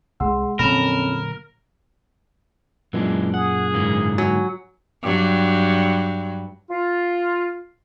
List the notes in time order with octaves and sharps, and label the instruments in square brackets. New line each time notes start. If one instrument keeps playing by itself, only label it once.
[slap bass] C2 [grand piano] G#3 C6 E6 [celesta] F#5
[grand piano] F2 C#4 [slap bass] A#2 D3 F#3 [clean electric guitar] A#4 [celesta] B5 E7
[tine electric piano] F#2 A#2 [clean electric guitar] E3 G#3 D4
[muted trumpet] G#4 [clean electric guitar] F#5
[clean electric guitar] G#2 D3 A#3
[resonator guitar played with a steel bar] F#3 [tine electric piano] G#5
[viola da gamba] G2 F#3
[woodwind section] F4